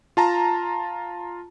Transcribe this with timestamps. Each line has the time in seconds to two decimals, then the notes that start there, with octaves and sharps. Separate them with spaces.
0.17 F4 A5 A#5